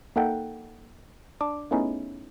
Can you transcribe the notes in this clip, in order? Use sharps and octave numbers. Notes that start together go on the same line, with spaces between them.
A#3 D#4 A4 F#5 G5
D4 D6
A3 B3 C#4 D#4 E4 G#4